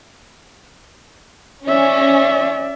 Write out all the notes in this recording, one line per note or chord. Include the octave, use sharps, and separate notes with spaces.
C#4 D5 E5